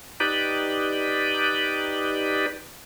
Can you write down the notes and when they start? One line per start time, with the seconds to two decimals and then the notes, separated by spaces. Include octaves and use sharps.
0.20 D#4 G4 B4 D5